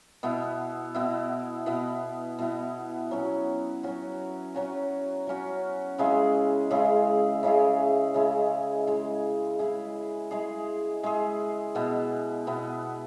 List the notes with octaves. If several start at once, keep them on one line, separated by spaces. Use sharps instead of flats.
B2 B3 E4
B2 B3 E4
B2 B3 E4
B2 B3 E4
F#3 C#4 F#4
F#3 C#4 F#4
F#3 C#4 F#4
F#3 C#4 F#4
C#3 G#3 E4 G#4
C#3 G#3 E4 G#4
C#3 G#3 E4 G#4
C#3 G#3 E4 G#4
G#3 E4 G#4
G#3 E4 G#4
G#3 E4 G#4
G#3 E4 G#4
B2 B3 E4
B2 B3 E4